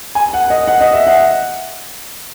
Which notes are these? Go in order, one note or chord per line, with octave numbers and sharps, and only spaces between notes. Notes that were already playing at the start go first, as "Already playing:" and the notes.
G#5
F#5
D#5
F#5
D#5
E5
F#5